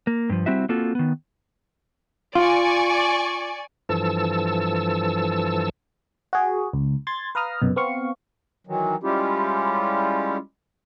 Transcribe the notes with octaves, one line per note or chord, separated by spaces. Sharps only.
A#3
G2 F3
G3 C4 E4 F#4 E5
A#3 C4 F4 F#4 A4
D#3 B3
F4 D5 G#5 C#6
G2 E3 F3 A4 A5 E6
F#4 G#4
C#2
C6 G#6 A6
B4 F5 A#5 D#6 F6
C2 F#2 B2
B3 C4 F5 C#6
D#3 E3 F#3
G3 G#3 C#4 E4 F4 G4